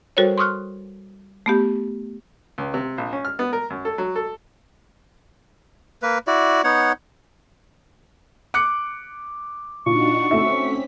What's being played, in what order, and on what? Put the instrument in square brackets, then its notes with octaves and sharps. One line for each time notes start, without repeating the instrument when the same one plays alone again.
[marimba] G3 F#4 A4 A#4 C5 C#5
C6 C#6 D#6 F6 F#6
A3 B3 G4
[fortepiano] C#2
C3
A#1
C#4
F6
B3
A#4
F#2
A4
F#3
A4
[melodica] A#3 B4
E4 F#4 D5
B3 D#4 C#5 F#5
[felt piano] D6 F#6 C#7
[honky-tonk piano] A#2 [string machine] D4 D#4 F#4 [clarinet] C#6
[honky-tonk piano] A3 F#4 E5 [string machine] C4 C#4 B6